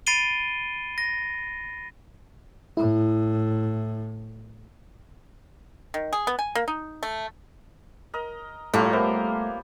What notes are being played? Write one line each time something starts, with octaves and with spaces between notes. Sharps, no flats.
B5 A6 C7 D7 D#7 G7
A#6
A2 E4
D#3
G#4
B3
G#5
A#3
D#4
A3
A#4 D#5
A2 G3 A3 A#3 F4 G4 C#5
B3 A#4 C5 E5